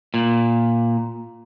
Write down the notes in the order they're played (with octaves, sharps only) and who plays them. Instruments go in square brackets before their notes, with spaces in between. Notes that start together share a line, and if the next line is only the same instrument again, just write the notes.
[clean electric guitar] A#2